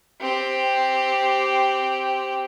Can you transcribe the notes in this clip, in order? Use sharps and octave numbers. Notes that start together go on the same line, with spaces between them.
C4 G4